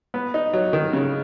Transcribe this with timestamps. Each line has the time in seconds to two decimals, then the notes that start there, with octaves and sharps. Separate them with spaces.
0.14 B3
0.34 D#4
0.53 F#3
0.73 D#3
0.93 C#3